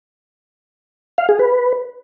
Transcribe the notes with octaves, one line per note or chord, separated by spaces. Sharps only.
F5
G#4
B4